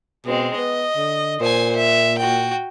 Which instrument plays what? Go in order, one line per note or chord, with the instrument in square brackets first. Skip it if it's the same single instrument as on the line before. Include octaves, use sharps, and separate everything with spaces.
[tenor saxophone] B2 [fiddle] G#3 C4
[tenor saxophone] B3 [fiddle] D#5
[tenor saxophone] D3
[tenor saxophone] A#2 [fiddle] C5 G#5
[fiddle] E5
F#4 G5